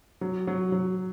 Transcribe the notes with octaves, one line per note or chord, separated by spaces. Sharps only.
F#3
F#3
F#3